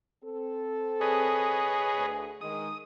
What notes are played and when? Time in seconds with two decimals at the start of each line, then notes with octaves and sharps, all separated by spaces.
0.24 C4 A4
1.01 G#4 B4 C#5 D#5
1.96 D2
2.41 D#3 G#3 D#6